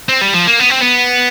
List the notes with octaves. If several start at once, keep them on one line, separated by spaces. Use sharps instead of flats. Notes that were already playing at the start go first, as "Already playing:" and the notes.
C4
G3
F3
A#3
B3
C4
B3